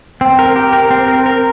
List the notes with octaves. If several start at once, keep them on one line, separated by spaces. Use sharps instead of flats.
C4
A#4
G4
A#4
C4
A#4
A#4